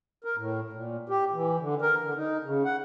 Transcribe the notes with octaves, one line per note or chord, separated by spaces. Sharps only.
A#4
A2
A#2
G4
E3
D3
A#4
D3
D#4
C#3
F#5